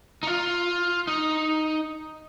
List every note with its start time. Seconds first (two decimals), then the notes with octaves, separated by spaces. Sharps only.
0.23 D#4
0.27 F4
1.07 D#4